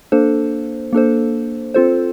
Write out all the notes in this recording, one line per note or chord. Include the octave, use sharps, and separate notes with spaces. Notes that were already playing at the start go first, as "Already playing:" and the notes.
A#3 D4 A4 C5
A#3 D4 A4 C5
C4 F4 A4 C5